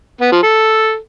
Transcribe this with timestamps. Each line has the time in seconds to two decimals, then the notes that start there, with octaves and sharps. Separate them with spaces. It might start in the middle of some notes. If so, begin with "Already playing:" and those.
0.21 B3
0.32 F3
0.43 A4